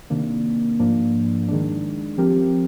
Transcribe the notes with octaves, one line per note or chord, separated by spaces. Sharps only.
C3 D#3 A#3 D4
G#2 F3 A#3 D4
D#3 G#3 D4
F3 C4 G4 A#4